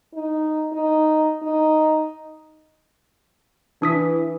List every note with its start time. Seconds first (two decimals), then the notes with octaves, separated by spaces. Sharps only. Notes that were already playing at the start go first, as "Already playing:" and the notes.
0.14 D#4
0.73 D#4
1.42 D#4
3.82 E3 D4 D#6 B6